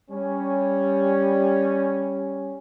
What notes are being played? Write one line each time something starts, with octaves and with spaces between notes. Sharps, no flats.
G3 C#4